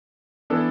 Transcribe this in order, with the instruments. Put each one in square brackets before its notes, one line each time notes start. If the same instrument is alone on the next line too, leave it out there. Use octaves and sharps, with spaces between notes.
[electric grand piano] E3 B3 D4 A4